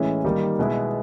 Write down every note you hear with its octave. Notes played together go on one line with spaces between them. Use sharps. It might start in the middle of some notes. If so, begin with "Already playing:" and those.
Already playing: A2 E3 G#3 C#4 E4
D#3 G3 A#3 D#4
B2 G#3 B3 E4